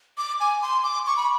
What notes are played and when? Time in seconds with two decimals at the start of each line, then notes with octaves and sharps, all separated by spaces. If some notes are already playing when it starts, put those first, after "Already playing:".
0.18 D6
0.40 G#5
0.62 C6
0.84 D6
1.06 C#6
1.17 B5